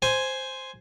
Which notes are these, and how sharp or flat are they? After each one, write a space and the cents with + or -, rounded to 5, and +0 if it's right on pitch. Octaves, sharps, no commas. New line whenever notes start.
C5 +0 G#5 +0